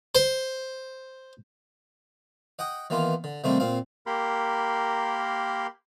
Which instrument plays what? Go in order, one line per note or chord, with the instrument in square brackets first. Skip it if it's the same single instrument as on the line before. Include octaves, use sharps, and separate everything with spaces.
[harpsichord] C5
D#5 F#5 G5 D#6
D#3 E3 A#3 B3 F4
D3
C3 D#3 G3 A3 A#3 C4
A#2 C4 F5
[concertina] A#3 G4 A#4 B5 C6